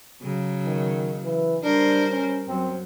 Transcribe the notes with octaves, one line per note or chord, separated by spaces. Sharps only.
C#3 F#3
D#3
E3
G3 D4 A#4 C5
C#4
F#2 C4